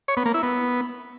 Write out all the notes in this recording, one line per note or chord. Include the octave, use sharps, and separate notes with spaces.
C#5
B3
A#3
E4
B3